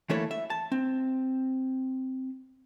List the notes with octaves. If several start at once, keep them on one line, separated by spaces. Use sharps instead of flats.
E3 A3 A#3 E4 A4 C#5
E5
A5
C4